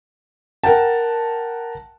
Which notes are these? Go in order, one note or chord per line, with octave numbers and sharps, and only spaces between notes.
A#4 F#5 G5 A5